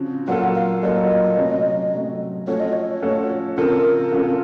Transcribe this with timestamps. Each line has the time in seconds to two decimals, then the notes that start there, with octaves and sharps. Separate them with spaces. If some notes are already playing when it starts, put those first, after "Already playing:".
Already playing: C#3 F3 C4 F#4
0.27 A#2 F#3 A#3 F4 A4 F#5
0.55 F5
0.82 A#2 F#3 A#3 F4 A4 D#5
1.37 C3 F#3 A3 C#4
1.92 C3 F#3 A3 C#4
2.47 F3 A3 C#4 F#4 A4 C#5
2.60 D#5
2.73 C#5
3.02 F3 A3 C#4 F#4 A4
3.58 C#3 F3 C4 F4 A4 A#4
4.12 C#3 F3 C4 F4 A4